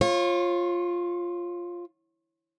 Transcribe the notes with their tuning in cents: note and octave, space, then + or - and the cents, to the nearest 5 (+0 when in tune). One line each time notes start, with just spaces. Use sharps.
F4 +0 C#5 -35